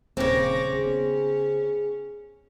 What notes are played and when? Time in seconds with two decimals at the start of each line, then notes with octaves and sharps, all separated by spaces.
0.17 D#1 C#3 C4 C#5 D6 A#6
0.72 B3 C#4 G#4